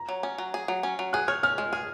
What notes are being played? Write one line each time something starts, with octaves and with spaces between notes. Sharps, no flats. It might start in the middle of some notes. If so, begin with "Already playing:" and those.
Already playing: A#5
F#3
C#4
F#3
G#4
F#3
C#4
F#3
G#4 F#6
C#5 F6
C#4 F6
G#3
G#4 F6